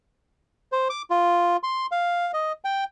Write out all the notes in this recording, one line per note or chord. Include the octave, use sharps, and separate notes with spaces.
C5
D6
F4
C6
F5
D#5
G5